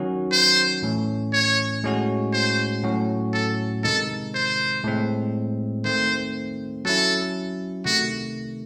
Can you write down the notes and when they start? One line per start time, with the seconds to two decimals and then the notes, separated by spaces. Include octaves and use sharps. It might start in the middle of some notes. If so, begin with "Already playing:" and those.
Already playing: D#3 F#3 C#4 F#4
0.32 C5
0.83 A2 E3 A3 C#4
1.33 C#5
1.83 A2 G#3 C#4 F#4
2.33 C5
2.84 A2 F#3 C#4 F#4
3.33 A4
3.84 C3 D#3 G#3 D#4 A4
4.35 C5
4.84 A2 G#3 C4
5.85 D#3 A3 C4 C5
6.85 F#3 C#4 E4 A4
7.85 C3 D#3 A3 F#4